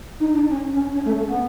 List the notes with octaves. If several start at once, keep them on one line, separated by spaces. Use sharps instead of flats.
D#4
D4
C#4
C#4
C#4
A3
A3
B3